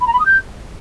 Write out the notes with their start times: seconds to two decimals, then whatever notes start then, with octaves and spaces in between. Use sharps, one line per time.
0.01 B5
0.07 A#5
0.13 B5
0.19 D#6
0.26 G6